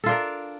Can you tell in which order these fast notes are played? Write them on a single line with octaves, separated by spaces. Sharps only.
A4 F4 D4 A#4